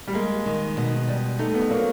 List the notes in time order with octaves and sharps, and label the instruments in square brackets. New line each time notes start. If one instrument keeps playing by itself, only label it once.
[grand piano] G3
[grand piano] G#3 [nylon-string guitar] A#3
[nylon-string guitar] D#3
B2
G3
[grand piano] A3 [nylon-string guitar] D#4
[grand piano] B3
[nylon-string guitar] F#3 [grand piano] A#3